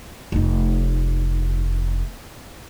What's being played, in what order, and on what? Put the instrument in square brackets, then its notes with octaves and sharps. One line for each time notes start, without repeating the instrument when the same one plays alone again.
[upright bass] F1 D#4